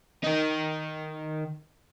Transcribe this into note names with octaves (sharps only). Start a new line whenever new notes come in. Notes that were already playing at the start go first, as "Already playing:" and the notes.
D#3 D#4